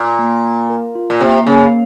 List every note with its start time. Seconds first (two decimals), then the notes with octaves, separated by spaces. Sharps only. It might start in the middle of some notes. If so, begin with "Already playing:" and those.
Already playing: A#2
0.19 A#3
0.45 A#3
0.70 A#4
0.95 F4
1.10 A#2
1.21 C3 A#3
1.46 C#3 A#3